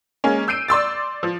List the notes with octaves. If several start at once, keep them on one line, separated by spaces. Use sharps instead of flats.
G#3 A#3 C#4
E6 G6 C7 D7 D#7
D5 C6 E6 A6
F3